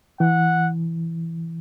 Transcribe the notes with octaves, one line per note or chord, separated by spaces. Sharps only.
E3 F#5